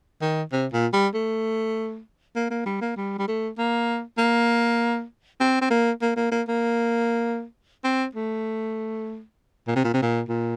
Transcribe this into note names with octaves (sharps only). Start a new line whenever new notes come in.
D#3
C3
A#2
G3
A3
A#3
A#3
G3
A#3
G3
G3
A3
A#3
A#3
C4
C4
A#3
A#3
A#3
A#3
A#3
C4
A3
A#2
C3
A#2
C3
A#2
A#2